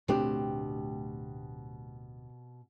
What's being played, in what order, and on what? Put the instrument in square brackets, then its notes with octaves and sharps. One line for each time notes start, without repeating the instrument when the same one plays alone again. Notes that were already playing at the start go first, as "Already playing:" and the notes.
[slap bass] D1 A3 D4 [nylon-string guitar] B2 C4 G4